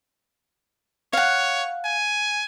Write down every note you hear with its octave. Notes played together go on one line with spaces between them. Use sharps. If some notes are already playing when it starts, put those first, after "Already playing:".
C#5 F5 F#5
G#5